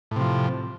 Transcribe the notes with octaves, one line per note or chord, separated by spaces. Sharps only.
A2 C3 F3